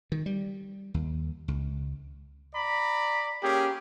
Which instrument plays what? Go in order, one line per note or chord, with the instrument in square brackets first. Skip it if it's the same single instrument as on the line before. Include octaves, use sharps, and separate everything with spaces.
[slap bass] D#3
G3
D#2
C#2
[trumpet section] D5 A#5 B5
[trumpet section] A#3 C#4 G#4 [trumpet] G4